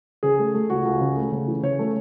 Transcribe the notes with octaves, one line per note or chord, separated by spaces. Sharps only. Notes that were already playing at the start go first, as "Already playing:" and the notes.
C#3 G#4
A3
A3
C#2 F#4
C#2
C#3
A3
C#3
E3
C#3 C#5
A3